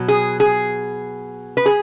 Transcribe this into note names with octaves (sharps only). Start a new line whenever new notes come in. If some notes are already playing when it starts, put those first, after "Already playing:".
Already playing: B2 F#3
G#4
G#4
B4
G#4